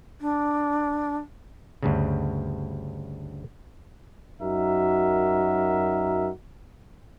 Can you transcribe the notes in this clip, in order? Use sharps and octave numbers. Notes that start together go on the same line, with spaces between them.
D4
D2 G2 C#3
F#2 D#4 F#4 A#4 E5